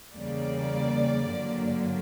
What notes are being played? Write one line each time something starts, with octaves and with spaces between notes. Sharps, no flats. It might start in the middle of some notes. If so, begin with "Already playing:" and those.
E2 C#3 G3 A#3 D5
G2 D3 F#3 A#3